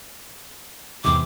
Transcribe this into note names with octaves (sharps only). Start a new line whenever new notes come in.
E2 G#2 C3 D6